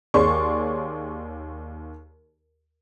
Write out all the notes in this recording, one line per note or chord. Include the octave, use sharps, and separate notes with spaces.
D#2 G#4 C#5 D5 C6 C#6